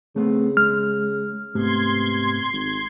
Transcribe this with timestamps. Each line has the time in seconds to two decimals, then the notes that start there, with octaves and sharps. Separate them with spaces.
0.16 C#3 A3 B3 C4
0.57 G#3 F6
1.55 G#2 C3 A3 B3 C6 G#6
2.53 G#1